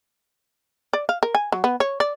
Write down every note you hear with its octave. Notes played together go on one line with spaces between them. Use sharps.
D5
F5
A#4
G#5
F#3
B3
C#5
D5